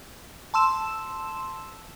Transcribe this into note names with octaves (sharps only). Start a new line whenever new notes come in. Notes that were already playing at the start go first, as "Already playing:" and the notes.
A5 C6 E6 E7